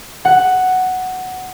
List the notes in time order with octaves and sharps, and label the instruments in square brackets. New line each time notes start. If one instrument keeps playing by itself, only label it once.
[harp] F#5